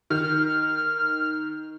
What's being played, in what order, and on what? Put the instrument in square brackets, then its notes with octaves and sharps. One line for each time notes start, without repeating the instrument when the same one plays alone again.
[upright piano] D#3 [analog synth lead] F6